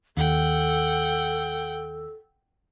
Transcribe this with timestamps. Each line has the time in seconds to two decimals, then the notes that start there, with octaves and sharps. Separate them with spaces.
0.17 D#2 A4 F#5 G5